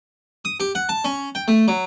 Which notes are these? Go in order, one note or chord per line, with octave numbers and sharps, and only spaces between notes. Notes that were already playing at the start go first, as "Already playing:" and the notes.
D#6
G4
F#5
A5
C#4
G5
A3
F#3